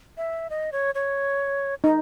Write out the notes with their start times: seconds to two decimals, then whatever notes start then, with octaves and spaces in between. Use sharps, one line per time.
0.17 E5
0.50 D#5
0.72 C#5
0.95 C#5
1.84 D#4 D#5